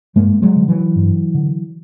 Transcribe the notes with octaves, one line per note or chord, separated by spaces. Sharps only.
G2 G#3 A#3
F#3 G#3
D3
E3 F#3
G2
D3